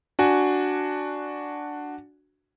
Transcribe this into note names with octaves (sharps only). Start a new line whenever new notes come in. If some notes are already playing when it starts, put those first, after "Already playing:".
D4 F#4 G#5